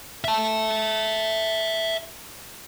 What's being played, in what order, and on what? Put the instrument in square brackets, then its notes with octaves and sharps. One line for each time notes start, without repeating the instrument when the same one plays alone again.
[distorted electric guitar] E5 A5